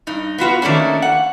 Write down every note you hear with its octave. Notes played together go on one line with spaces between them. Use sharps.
G2 D#4
B3 F4 F#4 B4
D#3 A3 A#3 C#4 D4
F#5